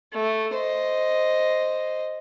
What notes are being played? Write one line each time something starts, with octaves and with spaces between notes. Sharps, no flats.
A3
C5 D#5